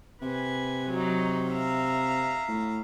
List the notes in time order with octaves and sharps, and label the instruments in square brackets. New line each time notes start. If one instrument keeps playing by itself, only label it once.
[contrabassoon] C3 [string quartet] B4 G#5
[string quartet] F#3 D#4
E5 F5 A#5
[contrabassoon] A2